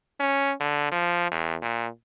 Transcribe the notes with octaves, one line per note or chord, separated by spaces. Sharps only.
C#4
D3
F3
E2
A#2